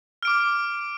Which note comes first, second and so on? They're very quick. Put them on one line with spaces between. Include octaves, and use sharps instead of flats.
F6 D7 D6